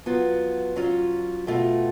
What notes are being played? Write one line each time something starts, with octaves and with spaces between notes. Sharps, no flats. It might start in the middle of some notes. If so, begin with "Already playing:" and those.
F#3 B3 F4
F#3 C#4 F4
B2 A3 F4